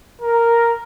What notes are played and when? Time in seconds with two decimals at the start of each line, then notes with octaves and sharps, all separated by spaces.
0.22 A#4